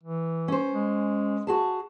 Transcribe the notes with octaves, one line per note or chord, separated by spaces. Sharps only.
E3
C#4 C5
G#3
F#4 G#4 A5